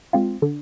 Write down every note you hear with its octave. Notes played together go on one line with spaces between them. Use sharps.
G#3 C4 F4
D3